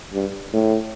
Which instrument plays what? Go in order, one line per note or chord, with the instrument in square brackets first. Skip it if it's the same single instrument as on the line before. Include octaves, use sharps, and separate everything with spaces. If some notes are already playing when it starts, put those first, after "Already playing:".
[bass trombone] G2
A2